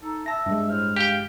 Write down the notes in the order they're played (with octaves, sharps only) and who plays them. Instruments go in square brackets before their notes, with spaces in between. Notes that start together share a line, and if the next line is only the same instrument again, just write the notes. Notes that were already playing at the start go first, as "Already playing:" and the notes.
[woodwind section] D#4 A4
[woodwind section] E5 [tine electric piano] A5 A#6
[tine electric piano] G2 G#3
[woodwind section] A2 C5 F6
[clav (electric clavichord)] G4 G5 [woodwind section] F5